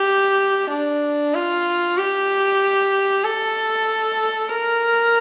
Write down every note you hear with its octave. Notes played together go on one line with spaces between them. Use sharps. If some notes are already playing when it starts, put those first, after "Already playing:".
Already playing: G4
D4
F4
G4
A4
A#4